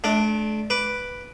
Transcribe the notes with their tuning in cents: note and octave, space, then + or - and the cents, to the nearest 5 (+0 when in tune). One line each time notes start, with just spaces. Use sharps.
A3 -40 D4 +0
B4 +0 D6 +0